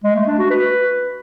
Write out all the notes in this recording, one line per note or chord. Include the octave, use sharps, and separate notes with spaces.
G#3
A3
D4
F#4
B4